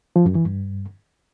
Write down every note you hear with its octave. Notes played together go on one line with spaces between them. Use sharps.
F3
F#2
E3
G2